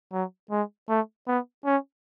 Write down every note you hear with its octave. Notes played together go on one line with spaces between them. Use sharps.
F#3
G#3
A3
B3
C#4